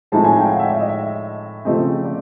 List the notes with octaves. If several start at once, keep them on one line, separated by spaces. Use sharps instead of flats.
A2 F3 G#3 C4 D#4 A5
G#5
G5
F5
F#5
E5
D5
D#5
E5
C#3 F3 A3 C4 D#5
D5